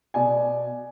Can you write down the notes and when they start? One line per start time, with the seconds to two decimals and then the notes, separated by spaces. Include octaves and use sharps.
0.14 B2 D5 G#5